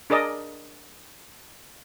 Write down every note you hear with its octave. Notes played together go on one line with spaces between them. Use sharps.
D4 G#4 A#4 D5 D#5